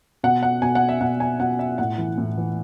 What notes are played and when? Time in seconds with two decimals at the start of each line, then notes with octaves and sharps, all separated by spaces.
0.23 B2 F#5
0.43 F#5
0.62 B2 G#5
0.75 F#5
0.89 E5
1.01 B2 F#5
1.20 G#5
1.40 B2 F#5
1.59 E5
1.78 A2 F#5
1.98 E3
2.18 A2
2.37 E3